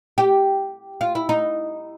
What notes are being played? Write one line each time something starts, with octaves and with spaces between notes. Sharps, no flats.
G4
F4
E4
D#4